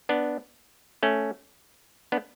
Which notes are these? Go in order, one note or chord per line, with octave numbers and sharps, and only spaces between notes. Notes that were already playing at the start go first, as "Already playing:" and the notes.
B3 D4
A3 C#4
B3 D4